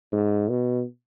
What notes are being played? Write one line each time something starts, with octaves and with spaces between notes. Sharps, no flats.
G#2
B2